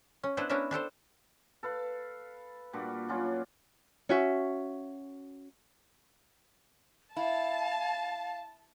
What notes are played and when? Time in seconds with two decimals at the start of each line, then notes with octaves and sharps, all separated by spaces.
0.23 C#4
0.37 B3 D4 E4 C5 F#5
0.49 B3 C#4 D4 E4 A#4 E5
0.71 D4 G4 A4 C5
1.63 A4 B4 F5
2.73 A#2 G3 D4 F#4
3.09 F#3 C#4 D4 F4
4.09 C#4 F#4 E5
7.16 E4 F5 A5